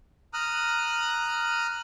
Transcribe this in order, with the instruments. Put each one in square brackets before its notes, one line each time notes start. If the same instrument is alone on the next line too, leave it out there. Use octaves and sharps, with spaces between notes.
[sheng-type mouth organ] A#5 D#6 F6 F#6